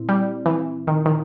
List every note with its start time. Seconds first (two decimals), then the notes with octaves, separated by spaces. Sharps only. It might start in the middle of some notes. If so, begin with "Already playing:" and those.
Already playing: A#2 C4 E4
0.09 G3
0.46 E3
0.87 D#3
1.06 D#3